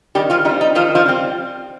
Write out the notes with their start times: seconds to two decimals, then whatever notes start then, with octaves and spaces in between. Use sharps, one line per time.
0.15 D#3 G3 G4
0.30 F3 F4
0.45 G3 D#4
0.49 C4
0.61 D#4
0.75 D#3 F3 F4
0.95 F3 F4
1.06 G3 C4